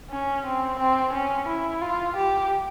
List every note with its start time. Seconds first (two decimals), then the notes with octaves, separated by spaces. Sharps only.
0.11 C#4
0.46 C4
0.79 C4
1.13 C#4
1.48 E4
1.81 F4
2.16 G4